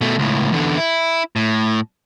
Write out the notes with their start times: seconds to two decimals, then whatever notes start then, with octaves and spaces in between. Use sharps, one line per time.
0.01 B2 A3
0.19 C#2 A2
0.52 E2 D3
0.77 E4
1.36 A2